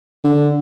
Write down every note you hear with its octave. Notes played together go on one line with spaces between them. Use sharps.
D3